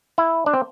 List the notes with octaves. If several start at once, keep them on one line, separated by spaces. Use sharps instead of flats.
E4
D4
C4